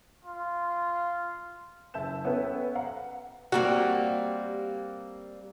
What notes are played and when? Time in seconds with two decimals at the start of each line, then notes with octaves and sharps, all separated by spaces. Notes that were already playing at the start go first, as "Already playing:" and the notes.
0.25 F4
1.94 F#1 E5 A5 G6 E7
2.25 B3 C#4 A4 B4 E5 G5
2.75 C5 F5 F#5 A#5
3.52 G3 A#3 C4 F#4